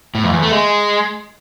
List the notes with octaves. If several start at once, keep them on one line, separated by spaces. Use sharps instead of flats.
A2
F2
E2
A3
G#3